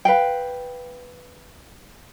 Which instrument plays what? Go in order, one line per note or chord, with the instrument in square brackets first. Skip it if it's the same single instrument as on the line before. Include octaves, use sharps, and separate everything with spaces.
[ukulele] B4 F5 G5